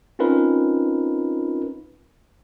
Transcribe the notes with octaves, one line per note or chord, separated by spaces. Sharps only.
C4 C#4 D#4 F4 A#4 B4